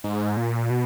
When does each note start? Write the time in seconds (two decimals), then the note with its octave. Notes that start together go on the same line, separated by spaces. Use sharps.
0.04 G#2
0.37 A#2
0.70 B2